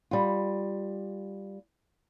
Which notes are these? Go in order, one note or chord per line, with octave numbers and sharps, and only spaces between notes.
G3 F4